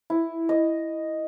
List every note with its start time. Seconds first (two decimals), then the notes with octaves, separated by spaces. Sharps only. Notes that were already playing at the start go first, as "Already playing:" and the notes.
0.10 E4
0.49 D#5